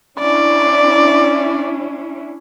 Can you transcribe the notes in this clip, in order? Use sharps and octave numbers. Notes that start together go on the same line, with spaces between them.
C#4 D4 E4 D5